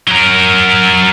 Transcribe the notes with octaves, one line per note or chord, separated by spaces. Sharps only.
F#3 A#4